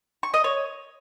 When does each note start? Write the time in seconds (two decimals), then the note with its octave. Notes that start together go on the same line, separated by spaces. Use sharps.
0.23 C#6
0.34 D#5
0.44 C#5